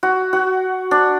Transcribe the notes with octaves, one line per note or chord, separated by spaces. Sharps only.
F#4
F#4
D4